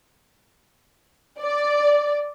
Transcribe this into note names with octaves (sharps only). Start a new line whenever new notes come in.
D5